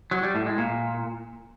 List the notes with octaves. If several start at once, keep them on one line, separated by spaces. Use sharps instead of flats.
F#3
G3
A2
G#3
A#2